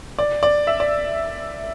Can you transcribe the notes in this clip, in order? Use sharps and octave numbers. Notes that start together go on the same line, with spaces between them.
D5
D5
E5
D5